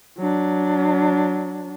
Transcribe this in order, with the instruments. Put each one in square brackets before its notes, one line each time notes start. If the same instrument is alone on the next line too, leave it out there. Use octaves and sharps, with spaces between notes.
[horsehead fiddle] F#3 D4